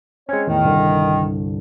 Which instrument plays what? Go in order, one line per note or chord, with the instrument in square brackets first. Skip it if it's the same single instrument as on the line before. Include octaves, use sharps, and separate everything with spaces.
[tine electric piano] G#3 C#4 [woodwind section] C4 C#5
[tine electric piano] E2 A2 [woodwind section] D#3
[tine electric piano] C2 G2 D3